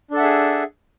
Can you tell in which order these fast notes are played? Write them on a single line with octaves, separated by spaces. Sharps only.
D4 A4 F#5 E5 G#4